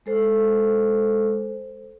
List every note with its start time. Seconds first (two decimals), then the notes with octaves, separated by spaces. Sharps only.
0.06 G#3 A4 C5